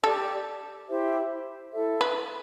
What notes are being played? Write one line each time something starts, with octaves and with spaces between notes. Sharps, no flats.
G4 A4 D5 A5
E4 G4 C5 E5
E4 A4 E5
B4